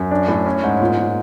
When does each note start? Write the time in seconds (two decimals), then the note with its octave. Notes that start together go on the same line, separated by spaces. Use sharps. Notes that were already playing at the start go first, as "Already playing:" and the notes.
Already playing: F#2
0.11 D4
0.28 A2
0.46 C#4
0.63 G#2
0.81 A#2
0.98 A#2